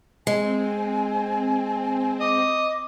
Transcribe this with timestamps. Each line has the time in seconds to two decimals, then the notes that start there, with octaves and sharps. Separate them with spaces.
0.27 G#3 C4 G#5
2.21 D#5 D6